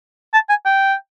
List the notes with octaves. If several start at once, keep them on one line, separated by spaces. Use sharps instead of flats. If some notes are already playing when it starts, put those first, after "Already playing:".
A5
G#5
G5